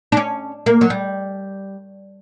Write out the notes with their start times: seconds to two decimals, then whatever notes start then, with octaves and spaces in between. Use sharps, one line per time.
0.12 D4
0.17 C#4
0.66 A#3
0.81 F#3
0.90 G3